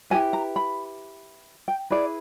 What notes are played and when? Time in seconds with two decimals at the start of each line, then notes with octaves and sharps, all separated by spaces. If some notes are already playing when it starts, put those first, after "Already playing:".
0.10 E4 G4 B4 G#5
0.33 A#5
0.56 B5
1.68 G5
1.90 E4 G#4 B4 D5